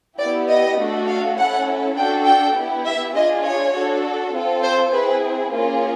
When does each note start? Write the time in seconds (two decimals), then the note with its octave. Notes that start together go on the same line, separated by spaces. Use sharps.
0.18 B3 E4 G4 D5
0.48 D#5
0.78 A3 D4 F#4 A4
1.08 F5
1.38 C#4 E4 A4 F#5
1.96 D4 F#4 A4 G5
2.25 G5
2.56 B3 E4 G4
2.86 E5
3.14 D4 F4 G#4 D#5
3.44 C#5
3.74 D4 F#4 A4
4.34 C4 F4 A4
4.62 C5
4.92 C4 E4 G#4 B4
5.52 A#3 C#4 F4 G#4